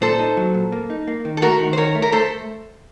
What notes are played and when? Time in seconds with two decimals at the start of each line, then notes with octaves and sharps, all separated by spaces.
0.02 A#2 A4 C5
0.19 D#4
0.37 F#3
0.54 A#2
0.72 A#3
0.90 D#4
1.08 A#3
1.25 D#3
1.37 A4
1.42 A3 F#4 A#4
1.60 D#3
1.73 C5
1.77 D#3 A#4 C#5
1.95 A3
2.02 A#4
2.12 A3 A4 C5